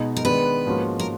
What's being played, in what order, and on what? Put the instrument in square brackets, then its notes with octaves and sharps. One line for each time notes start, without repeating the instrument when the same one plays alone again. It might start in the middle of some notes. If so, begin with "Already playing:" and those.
Already playing: [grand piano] B2 G#3 B3 D#4
[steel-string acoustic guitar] A#4
[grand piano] D#3 G#3 B3 D4 [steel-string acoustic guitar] B4
[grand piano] G#2 F3 A#3 C#4 F#4
[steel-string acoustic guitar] A#4